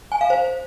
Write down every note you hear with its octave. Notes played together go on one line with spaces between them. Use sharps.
G#5
F5
C5